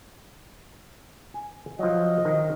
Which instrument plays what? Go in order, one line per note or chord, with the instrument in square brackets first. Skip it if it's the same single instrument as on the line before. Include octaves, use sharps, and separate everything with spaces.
[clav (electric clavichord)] G#5
[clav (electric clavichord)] F3 F#3 [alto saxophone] D#5
[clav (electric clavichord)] D#3